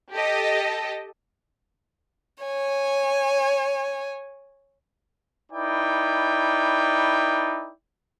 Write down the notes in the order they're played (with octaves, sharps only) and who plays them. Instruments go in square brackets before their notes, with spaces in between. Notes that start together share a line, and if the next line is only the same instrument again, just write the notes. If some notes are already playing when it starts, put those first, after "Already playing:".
[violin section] G4 A4 D#5
[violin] C#5 G#5
[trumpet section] D#4 E4 B4 D5 G5